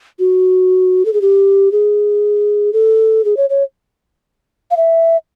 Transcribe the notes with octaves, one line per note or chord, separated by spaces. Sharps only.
F#4
A4
G#4
G4
G#4
A4
G#4
C#5
C#5
F5
E5